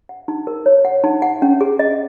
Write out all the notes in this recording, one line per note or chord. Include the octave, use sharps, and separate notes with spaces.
F#5
D#4
A#4
C#5
F#5
D#4
F#5
C#4
G#4
D#5